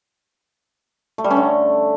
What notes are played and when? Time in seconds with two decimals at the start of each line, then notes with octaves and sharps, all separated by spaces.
1.18 A3
1.24 G3
1.31 C#4
1.37 D3